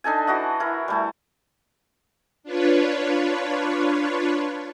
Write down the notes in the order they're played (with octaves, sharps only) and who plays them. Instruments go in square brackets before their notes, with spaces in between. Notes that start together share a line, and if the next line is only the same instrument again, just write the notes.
[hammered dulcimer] D4 D#4 A4 G#5
E3 F#4 D#5 F#5
E4 A#4
G3 A3 G#5
[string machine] D4 F4 B4 C#5